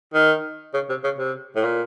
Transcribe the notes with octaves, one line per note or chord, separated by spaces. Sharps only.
D#3
C#3
C3
C#3
C3
A2
A#2